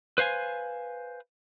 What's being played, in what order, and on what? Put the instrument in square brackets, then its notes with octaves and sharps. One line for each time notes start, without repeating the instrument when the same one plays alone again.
[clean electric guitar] B4 C5 F5 G#5